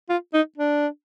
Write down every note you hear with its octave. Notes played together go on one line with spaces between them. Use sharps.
F4
D#4
D4